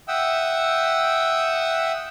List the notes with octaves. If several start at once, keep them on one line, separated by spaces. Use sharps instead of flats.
E5 F#5 G5 D#6 E6